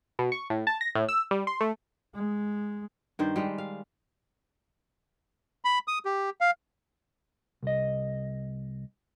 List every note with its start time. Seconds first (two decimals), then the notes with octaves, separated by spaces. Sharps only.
0.19 B2
0.32 C#6
0.50 A2
0.67 A5
0.81 A#6
0.95 A2
1.09 E6
1.31 G3
1.47 C6
1.61 A3
2.15 G#3
3.19 G2 D#3 C5
3.36 G3 G#3
3.58 F5
5.65 B5
5.88 D#6
6.05 G4
6.41 F5
7.63 C2 D#5